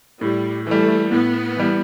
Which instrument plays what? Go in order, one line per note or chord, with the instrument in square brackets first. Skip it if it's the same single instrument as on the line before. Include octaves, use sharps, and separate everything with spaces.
[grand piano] A2 [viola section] G3
[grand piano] E3 G3 [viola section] A3
[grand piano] A2 [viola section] B3
[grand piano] E3 G3